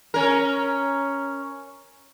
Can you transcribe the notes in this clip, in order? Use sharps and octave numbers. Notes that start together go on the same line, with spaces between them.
C#4 A#4